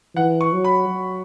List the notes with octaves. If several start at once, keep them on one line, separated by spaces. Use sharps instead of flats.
E3 F#5
C#6
F#3
B5
F#3